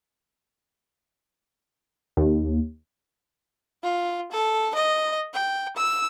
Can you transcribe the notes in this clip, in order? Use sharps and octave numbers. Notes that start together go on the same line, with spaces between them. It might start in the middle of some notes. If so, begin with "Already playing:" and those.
D#2
F4
A4
D#5
G5
E6